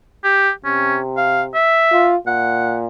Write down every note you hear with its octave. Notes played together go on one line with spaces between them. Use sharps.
G4
C3 C#4
F5
E5
F4
A#2 F#5